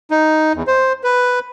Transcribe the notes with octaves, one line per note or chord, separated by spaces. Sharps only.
D#4
E2
C5
B4